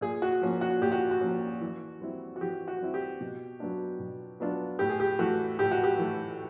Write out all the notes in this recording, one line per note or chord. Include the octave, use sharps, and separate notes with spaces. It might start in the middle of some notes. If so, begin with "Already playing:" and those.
A#2 G#4
F#4
F3 A#3 C#4
F#4
A#2 G4
F#4
F#4
F3 A#3 C#4
E3
G3 C4 E4
F#4
E3 G4
F#4
G3 C4 E4
G4
B2
F#3 B3 D4 F4
B2
F#3 B3 D4 F4
A2 G4
G#4
G4
E3 A3 F#4
A2 G4
F#4
G4
E3 A3